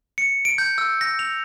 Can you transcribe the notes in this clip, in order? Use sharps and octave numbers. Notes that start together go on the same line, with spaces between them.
C#7
D7
G6
E6
A#6
F7